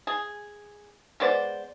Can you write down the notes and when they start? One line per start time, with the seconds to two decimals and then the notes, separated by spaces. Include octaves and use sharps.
0.07 G#4
1.20 G#3 B3 C5 D5